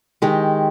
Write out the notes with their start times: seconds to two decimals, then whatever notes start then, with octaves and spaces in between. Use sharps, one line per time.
0.22 D#3 G#3 G4